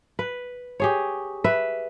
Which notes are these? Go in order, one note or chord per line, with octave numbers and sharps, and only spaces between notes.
B4
G4 G#4 C#5
B4 E5